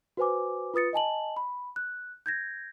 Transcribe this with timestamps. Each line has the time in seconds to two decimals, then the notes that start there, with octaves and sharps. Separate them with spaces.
0.17 F#4 B4 C5 G#5 D6
0.74 F4 B4 D#6 A6 C#7
0.93 D#5 G#5 A5 F#7
1.37 B5
1.76 F#6
2.26 G6 G#6 A#6